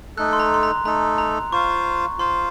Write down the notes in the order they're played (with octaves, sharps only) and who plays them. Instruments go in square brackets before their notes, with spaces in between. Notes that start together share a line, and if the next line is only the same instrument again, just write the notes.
[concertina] A3 D#4 A4 [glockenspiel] F#6
[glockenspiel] C6
A#5
C6
A#5
[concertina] A3 D#4 A4 [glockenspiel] A#5
[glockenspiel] A#5
[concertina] F4 C5 F5 [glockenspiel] C#6
[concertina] F4 C5 F5 [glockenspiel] C6